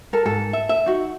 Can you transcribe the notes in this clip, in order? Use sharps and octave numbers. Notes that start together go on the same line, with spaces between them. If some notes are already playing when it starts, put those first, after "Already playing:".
A4 A#4
G#2 A4
E5
E5
D#4 F#4